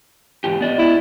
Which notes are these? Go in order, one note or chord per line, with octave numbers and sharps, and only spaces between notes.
E2 G#2 G4
B3 D5 D#5
E4